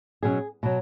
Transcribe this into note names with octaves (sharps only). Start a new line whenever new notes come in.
B2 F#3 C#4 G#4
B2 F#3